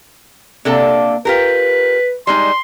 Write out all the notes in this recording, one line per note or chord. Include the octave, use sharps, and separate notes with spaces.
C3 A#3 D4 A4
F4 G4 A#4 B4
G3 G#3 D#4 C6